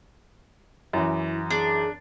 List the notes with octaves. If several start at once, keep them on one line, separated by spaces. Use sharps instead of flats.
F#2 E3 E4
D4 G#4